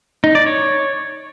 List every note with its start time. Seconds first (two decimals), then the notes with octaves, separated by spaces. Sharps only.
0.24 D#4
0.35 D5
0.46 C#5